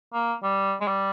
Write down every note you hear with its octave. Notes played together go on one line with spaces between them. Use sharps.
A#3
G3
G#3
G3